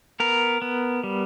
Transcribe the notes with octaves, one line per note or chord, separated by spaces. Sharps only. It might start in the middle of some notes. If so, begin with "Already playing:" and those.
B3 A#4
B3
G3